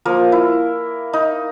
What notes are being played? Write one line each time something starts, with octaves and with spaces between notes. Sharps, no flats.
F3 A#3 A#4
E4
D#4